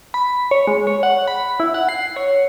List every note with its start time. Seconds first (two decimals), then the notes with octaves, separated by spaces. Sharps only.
0.14 B5
0.51 C#5
0.67 G#3
0.87 C#5
1.03 F#5
1.28 B5
1.60 E4
1.74 F#5
1.89 C7
2.16 C#5